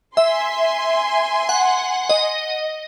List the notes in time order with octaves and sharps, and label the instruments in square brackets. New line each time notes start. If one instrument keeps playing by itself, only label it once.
[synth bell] E5 [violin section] G#5 C6
[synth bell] F#5
D#5